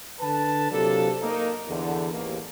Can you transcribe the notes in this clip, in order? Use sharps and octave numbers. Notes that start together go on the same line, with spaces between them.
D3 B4 A5
C3 F#3 A#3 D4 F4 A4
A#3 D#4
E2 D3
A1 D#2 A#3